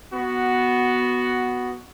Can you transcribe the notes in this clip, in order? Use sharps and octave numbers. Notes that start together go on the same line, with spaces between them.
B3 F#4